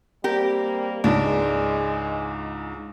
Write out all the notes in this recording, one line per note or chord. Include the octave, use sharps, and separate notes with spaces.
G3 A#3 C4 G4 A#4
C#2 G#2 G#3 D4